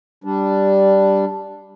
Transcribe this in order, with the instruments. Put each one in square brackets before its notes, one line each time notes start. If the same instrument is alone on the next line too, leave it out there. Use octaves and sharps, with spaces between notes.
[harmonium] G3 D4